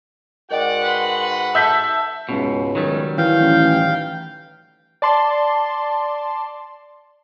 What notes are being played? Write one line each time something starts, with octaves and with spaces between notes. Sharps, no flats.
G#2 F#4 A#4 D5 D#5 F#5 G5
B4 C6
A4 E5 A5 G6 B6
C#2 G#2 B2
D#3 F#3 G3
E3 F5 G5
A1
D5 A5 C6